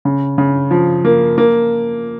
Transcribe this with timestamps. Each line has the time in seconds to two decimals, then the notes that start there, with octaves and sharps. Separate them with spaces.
0.05 C#3
0.38 C#3
0.71 F3
1.05 A#3
1.38 A#3